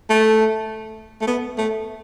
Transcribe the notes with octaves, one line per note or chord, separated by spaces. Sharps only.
A3
A3
B3
A3